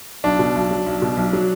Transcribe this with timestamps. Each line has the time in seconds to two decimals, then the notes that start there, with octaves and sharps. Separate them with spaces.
0.24 B1 D4
0.39 B2
0.55 B1
0.71 F#3
0.86 B1
1.02 B2
1.17 B1
1.33 F#3